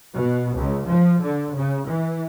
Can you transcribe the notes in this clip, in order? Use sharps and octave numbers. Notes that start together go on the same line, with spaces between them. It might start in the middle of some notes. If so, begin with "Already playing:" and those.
B2
C#2
F3
D3
C#3
E3